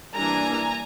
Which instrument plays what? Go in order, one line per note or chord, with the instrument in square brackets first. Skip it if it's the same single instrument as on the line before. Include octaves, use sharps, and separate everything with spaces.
[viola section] E3 G3 A#3 D4 G#5 A#5